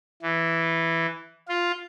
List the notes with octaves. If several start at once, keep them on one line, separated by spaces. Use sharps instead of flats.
E3
F4